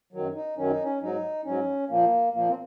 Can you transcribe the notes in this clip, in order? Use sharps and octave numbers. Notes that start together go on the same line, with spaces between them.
F#2 D#3 F#3
D#4
F#2 D#3 F#3 C#4
D#4
C#4
G#2 F#3 D#4
G#2 F#3 C#4
A#2 F3 A#3
A#2 F3 A#3
C4